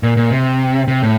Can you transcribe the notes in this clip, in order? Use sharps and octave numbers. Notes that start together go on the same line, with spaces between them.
A#2
A#2
C3
C3
A2